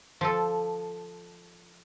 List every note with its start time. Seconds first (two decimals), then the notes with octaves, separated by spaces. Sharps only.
0.21 F3 A4